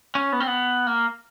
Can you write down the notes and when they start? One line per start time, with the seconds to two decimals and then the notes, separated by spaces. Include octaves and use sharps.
0.15 C#4
0.33 B3
0.40 C4
0.47 B3
0.87 A#3